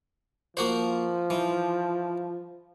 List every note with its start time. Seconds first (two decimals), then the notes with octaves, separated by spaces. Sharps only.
0.57 F3 A#3 F#4 C5
1.30 E3